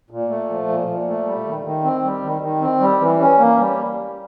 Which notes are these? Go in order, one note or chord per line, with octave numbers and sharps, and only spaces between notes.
A#2
A3
F3
A#2
A#2
A3
G3
D#3
D#3
C4
G3
D#3
D#3
C4
G3
E3
C#4
A#3
G3